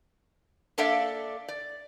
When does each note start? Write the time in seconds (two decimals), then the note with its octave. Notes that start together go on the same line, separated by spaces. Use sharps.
0.78 A#3 D4 A4 D5 E5 F5
1.48 D5